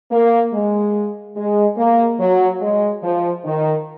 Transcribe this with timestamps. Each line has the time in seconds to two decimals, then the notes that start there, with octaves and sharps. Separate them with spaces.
0.11 A#3
0.52 G#3
1.36 G#3
1.77 A#3
2.20 F#3
2.61 G#3
3.03 F3
3.45 D#3